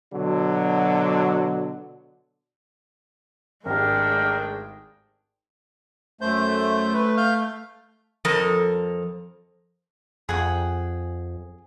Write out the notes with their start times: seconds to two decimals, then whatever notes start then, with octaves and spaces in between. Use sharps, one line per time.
0.12 B2 D3 F#3
3.66 G#1 G#3 A3 D4 G4 G#4 A#4 G5
6.21 F#2 A3 C5 G6
6.94 B4
7.17 F5 F6 G6
8.25 F2 F3 A4 A#4
10.29 F2 G#4 F#5 G5